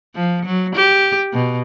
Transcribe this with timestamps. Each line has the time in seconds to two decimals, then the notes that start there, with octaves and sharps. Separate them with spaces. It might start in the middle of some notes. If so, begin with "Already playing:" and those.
0.15 F3
0.45 F#3
0.75 G4
1.33 B2